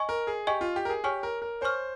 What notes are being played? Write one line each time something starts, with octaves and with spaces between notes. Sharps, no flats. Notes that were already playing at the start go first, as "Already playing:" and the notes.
Already playing: D#5 G#5 C#6
A#4
G#4
G4 D#5 G#5 C#6
F4
G4
A#4
G#4
G4 C#5 G#5 C#6 F6
A#4
A#4
C5 C#5 G#5 C#6 F6